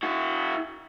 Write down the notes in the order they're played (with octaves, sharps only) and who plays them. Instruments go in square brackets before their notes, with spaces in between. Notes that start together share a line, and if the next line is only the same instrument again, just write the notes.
[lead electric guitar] E4 F#4